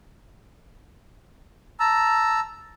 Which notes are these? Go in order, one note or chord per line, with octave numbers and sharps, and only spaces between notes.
A5 A#5 E6